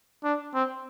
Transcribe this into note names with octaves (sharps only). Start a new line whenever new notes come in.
D4
C4